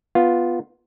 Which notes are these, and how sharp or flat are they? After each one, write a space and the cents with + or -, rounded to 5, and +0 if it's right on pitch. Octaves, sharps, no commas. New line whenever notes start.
B3 +0 F4 +0